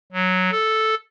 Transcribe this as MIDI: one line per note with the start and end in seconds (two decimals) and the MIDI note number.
0.13 0.50 54
0.51 0.95 69